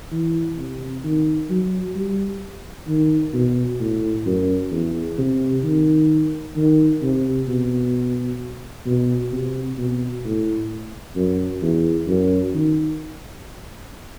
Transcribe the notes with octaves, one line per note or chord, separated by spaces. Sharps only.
E3
C3
D#3
F#3
G3
D#3
B2
A2
F#2
E2
C3
D#3
D#3
C3
B2
B2
C3
B2
A2
F#2
E2
F#2
D#3